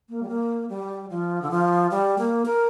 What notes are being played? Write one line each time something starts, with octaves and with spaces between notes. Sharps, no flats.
A#3
G3
A#3
G3
F3
D3
F3
G3
A#3
A#4